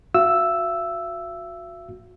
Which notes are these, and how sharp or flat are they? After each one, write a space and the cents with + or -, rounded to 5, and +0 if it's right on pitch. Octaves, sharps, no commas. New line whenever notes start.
F#4 -25 E5 +45 E6 +0